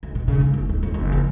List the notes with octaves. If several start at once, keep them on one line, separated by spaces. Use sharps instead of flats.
D2
B2
C#3
A#3
F#1
D1
F2
F#1
F3